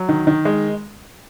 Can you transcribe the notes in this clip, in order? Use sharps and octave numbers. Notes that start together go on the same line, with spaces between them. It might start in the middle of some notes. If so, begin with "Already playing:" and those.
Already playing: F#3
D#3
D#3
G#3